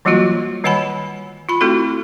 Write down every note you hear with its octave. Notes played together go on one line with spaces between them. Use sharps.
E3 F#3 G3 A#3 F4 F#4
D#3 G3 C#5 F#5 G#5 B5
F4 B5
A3 C4 E4 F#4 A4